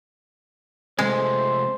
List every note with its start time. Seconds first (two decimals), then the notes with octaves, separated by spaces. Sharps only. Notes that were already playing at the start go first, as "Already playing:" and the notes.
0.99 C3 G#3 A3 C5